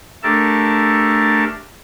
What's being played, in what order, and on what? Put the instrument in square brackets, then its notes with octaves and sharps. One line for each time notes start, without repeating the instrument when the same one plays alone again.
[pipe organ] A3 D4 G4 A4 A#4 A5